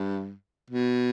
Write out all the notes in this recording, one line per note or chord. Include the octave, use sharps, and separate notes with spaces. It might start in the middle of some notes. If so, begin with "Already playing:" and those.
Already playing: G2
B2